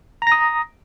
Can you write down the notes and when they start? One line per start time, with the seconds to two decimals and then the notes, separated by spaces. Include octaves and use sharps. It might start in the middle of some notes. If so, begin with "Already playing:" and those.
0.22 A#5
0.27 A#6
0.32 D#6